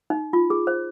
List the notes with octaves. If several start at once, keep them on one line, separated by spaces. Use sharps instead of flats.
D#4
F4
G#4
C5